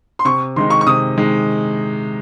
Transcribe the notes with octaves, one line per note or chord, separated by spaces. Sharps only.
C6
C3 C#6
D#3 G#3 D#4 C6
C#6
C#6
C3 D#6
D#3 G#3 D#4